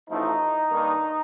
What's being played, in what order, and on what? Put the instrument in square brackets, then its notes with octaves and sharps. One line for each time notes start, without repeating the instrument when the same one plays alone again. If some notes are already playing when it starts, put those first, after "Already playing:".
[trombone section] A1 A2 F3 A3 D#4
G2 D#3 A#3